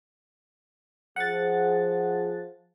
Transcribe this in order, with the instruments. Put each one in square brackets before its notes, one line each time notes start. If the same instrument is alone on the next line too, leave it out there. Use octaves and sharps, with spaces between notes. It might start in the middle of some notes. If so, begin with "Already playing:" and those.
[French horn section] F3 G#4 [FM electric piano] F#5 A6